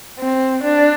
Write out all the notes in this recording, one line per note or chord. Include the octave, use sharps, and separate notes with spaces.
C4
D4